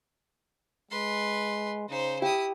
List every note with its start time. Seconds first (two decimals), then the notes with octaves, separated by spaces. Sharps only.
0.91 G#3 B4 C6
1.89 C#3 D#4 C5
2.22 E4 G4 D#6